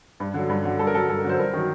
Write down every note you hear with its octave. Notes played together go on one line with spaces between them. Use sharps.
G2
D3 F#3
G2
D3 F#3
G2 A4
A#4
D3 F#3 A4
G2 A4
A#4
D3 F#3 C5
G2 A#4
D#3 F#3